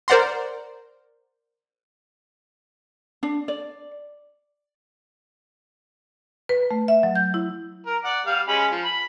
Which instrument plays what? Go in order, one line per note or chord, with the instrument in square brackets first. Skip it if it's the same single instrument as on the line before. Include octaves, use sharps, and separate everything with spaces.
[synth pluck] A#4 C5 D5 F#5 A#5 C6
[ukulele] D4
D5
[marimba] B4
A3
E5
F#3
G6
E4
[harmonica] A#4
D5 F#5
G3 F5
G#3 C#4 B5
F3
B5